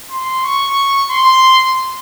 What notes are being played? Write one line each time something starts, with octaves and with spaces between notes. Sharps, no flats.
C6
C#6
C6